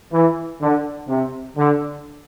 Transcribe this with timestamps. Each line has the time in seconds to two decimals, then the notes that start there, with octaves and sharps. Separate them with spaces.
0.12 E3
0.60 D3
1.08 C3
1.56 D3